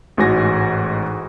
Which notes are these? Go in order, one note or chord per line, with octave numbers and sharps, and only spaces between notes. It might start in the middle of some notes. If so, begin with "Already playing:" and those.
A1 G#2 F#4 G#5 A#6